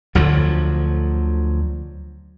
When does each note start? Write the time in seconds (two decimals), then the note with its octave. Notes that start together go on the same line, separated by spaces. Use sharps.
0.15 D2 D3 F3 F#3